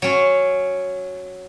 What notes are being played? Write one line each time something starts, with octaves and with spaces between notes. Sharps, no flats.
F#3 C#4